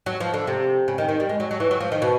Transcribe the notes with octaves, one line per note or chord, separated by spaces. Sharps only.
F#3
F3
D3
C3
C#3
D#3
D#3
G3
G#3
F#3
F#3
E3
F#3
F3
D#3
B2